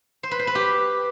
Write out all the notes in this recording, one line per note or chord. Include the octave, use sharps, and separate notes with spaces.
C5
B4
C5
B4
G4